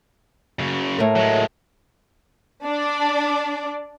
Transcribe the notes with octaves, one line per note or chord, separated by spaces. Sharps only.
F#2 C#3
A2 A#4
F#3 G#3
D4 D5